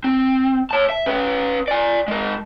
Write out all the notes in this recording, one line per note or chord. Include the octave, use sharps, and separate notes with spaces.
C4
C#5 A5
E5
C#4 B4
D5 G#5
G#3 A#4